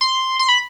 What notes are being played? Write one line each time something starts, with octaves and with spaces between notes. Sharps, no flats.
C6
C6
B5